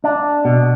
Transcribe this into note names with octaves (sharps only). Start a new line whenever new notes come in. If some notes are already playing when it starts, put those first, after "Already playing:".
D4
B2